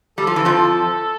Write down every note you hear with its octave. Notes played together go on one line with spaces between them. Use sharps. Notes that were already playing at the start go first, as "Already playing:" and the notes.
G3 A4
F3
E3
F2 F3